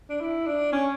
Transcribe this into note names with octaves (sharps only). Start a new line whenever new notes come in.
D4
E4
D4
C#4